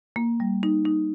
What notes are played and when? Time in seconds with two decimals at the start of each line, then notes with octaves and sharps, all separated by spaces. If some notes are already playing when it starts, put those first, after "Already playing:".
0.16 A#3
0.40 G3
0.63 D#4
0.85 D#4